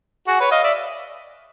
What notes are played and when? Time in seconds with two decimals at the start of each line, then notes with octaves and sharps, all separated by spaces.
0.27 F#4 G#4
0.40 B4 C#5
0.51 D#5 F5
0.64 D5 E5